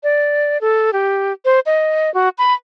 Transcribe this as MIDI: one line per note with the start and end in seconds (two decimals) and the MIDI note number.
0.03 0.58 74
0.61 0.90 69
0.93 1.33 67
1.45 1.60 72
1.66 2.12 75
2.14 2.29 66
2.38 2.54 83